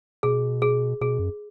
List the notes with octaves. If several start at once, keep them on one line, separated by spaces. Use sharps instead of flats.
B2 G#4
G#4
B2 G#4
F#2